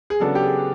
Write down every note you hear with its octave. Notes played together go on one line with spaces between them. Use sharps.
G#4
C#3 F#3 B3 D4 F#4 A4
G4
G#4